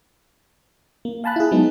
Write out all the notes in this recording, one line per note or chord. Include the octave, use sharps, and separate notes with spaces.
A#3
F5 G#5 A5 B5 F#6
E4 G#4
F#3 G#3 B3 D#4